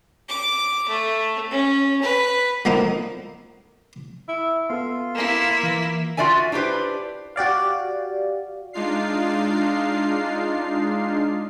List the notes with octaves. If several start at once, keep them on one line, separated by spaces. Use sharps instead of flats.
D6
A3
C#4
B4
D3 F3 A#3 D#4 E4
E4
B3 F4 A4 E6
A#3 E4
E3
F4 F#4 D5 E5 G#5
D4 E4 G4 B4 C5
F#4 G4 D5 F5
G#3 D4 D#4 F4 F5 C7